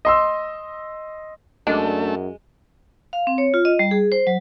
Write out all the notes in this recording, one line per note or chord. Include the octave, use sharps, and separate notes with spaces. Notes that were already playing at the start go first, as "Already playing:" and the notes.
D#5 C6 E6
F#2 G#3 A3 D4
F5
C4
C#5
F4
D#5
G3
G#4
C5
F#3